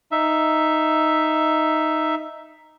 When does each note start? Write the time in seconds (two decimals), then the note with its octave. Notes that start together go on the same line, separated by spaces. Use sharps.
0.12 D#4 E5